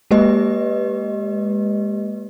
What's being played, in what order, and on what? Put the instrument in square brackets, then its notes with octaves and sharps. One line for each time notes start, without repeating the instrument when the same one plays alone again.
[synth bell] G#3 A#3 G4 B4 D#5